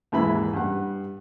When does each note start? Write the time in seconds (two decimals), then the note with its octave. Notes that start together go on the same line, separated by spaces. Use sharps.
0.12 D#2 G#2 E3 E5 B5
0.53 G2 F#5